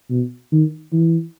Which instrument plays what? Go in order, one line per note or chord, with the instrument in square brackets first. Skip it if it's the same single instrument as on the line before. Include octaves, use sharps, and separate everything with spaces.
[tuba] B2
D#3
E3